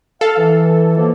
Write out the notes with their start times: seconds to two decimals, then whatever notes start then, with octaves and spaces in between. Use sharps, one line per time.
0.21 A4 F5
0.38 E3
0.97 B2 F3 A#3